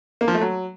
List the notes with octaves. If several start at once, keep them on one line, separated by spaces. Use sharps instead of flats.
A#3
F3
A3
F#3